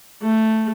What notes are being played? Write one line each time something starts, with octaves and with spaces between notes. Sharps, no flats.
A3